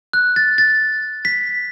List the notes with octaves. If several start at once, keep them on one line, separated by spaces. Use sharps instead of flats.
F#6
A6
A6
B6